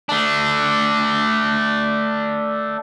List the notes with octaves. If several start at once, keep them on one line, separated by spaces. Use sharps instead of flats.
A3 D4